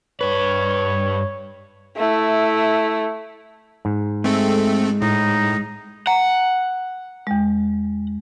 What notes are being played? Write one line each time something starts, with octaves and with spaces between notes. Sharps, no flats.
G2 B4 C#5
A3 E4
G#2
G#3 A3 C4 A4
A2 D#4
F#5 A#5
E2 G#3